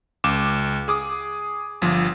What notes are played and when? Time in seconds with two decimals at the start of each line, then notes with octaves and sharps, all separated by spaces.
0.24 C#2 D6 E7
0.88 G#4 D6 D#6
1.82 G1 F3